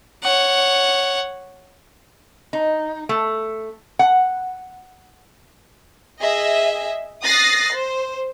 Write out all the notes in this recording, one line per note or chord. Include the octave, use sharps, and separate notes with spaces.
C#5 F#5
D#4
A3
F#5
G#4 D#5 E5
D#6 F#6 A6 A#6 C7
C5